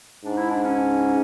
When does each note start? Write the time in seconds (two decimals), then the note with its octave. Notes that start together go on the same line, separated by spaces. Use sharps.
0.25 G#2 D4
0.37 E4
0.51 D4
0.64 C#4